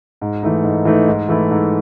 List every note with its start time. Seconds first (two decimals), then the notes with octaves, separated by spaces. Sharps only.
0.21 G#2
0.43 E3 A3 D#4
0.64 G#2
0.85 E3 A3 D#4
1.08 G#2
1.29 E3 A3 E4
1.51 G#2